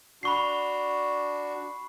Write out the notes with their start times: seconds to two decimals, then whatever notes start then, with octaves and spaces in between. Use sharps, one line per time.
0.23 D4 F#4 B5 C#6 C7